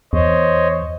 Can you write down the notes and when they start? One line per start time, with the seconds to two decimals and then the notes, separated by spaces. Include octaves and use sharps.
0.13 E2 C5 C#5 D#5